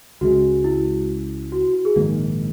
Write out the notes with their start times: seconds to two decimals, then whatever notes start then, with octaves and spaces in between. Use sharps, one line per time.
0.21 C#2 C#3 G#3 F#4
0.64 E4
1.52 F#4
1.63 F#4
1.74 F#4
1.85 G#4
1.96 A#1 G#2 D#3 A#3